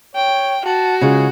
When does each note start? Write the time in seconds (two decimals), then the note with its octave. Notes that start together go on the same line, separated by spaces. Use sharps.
0.15 C#5 G5
0.66 F#4 A5
1.01 C#3 G#3 F4 G#4